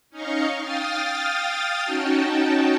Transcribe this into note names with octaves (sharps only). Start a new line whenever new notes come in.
C#4 D#4 D#5 F5 C#6
F5 G5 D#6 F6 A6
C#4 D#4 F#4 G5 A5